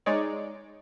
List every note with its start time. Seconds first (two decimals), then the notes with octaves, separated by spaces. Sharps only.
0.06 G#3 D#4 C#5 D5